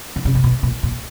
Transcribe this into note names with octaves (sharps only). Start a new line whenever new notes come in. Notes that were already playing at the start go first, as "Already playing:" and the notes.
D3
C#3
C3
B2
A#2
A#2